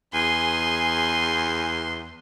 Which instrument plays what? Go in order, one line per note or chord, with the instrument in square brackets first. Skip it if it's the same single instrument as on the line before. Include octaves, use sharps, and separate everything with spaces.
[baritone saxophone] E2 [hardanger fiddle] G#4 G#5 [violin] C6